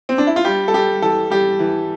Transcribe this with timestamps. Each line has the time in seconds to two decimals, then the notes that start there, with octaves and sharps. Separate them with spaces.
0.09 C4
0.18 D4
0.27 E4
0.36 F4
0.45 G3 G4
0.68 A4
0.74 G3 G4
1.02 E3 A4
1.30 G3 G4
1.59 E3